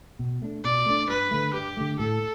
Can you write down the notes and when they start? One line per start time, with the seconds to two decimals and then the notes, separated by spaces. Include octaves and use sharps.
0.19 B2
0.42 A3 D4
0.64 B2 D5
0.86 A3 D4
1.09 G2 B4
1.31 D3 A3
1.54 G2 G4
1.77 D3 A3
2.00 A2 A4